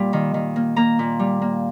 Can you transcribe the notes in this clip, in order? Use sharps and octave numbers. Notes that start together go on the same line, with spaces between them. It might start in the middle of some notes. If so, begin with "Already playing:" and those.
Already playing: A#2 G3 A#3
D#3
D#3
A#3
A#3 A#5
A#2
G3
A#3